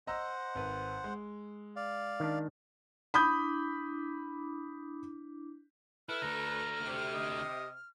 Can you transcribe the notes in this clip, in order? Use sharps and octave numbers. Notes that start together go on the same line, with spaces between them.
C5 D#5 F#5 A#5 E6
G#1 B4
G#3
D5 F5
D#3 D4
D4 E4 B5 D6 D#6 G6
E4 A4 B4 F6
D3 A3 A#5
C3
D#5